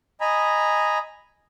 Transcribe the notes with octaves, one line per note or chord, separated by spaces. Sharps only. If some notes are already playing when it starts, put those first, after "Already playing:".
D#5 G#5 A#5 B5